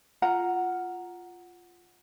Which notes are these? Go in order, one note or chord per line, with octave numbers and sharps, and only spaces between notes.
F4 F#5 A#5